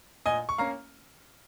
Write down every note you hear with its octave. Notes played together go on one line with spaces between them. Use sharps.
A#2 D#5 G#5
C#6
A#3 C#4 F5 A#5